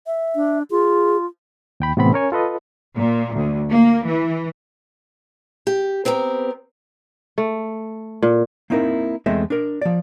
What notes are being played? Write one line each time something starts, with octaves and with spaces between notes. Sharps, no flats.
E5
D4
F4 G#4
D#2 G5 B5
A2 C3 E3 B3 C4 B5
C#4 A#4 C#5 G#5
F4 A4 B4 D#5
A#2
D2
A#3
E3
G4
B3 C4 G4 A4 A#4
A3
A#2
A#3 C4 D#4 E4 A4 A#4
E2 G#3 A3 C4 D#5 E5
D4 A#4
F3 D5